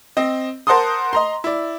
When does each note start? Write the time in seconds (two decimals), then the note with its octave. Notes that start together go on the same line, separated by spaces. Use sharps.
0.17 C4 D#5
0.67 A#4 C5 F#5 A5 C6 D#6
1.13 D#5 A#5 C6
1.44 E4 D5